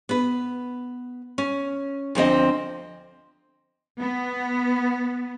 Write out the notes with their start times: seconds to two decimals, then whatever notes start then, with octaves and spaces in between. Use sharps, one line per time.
0.09 B3 B4
1.38 C#4
2.15 D2 F3 C4 D#5
3.99 B3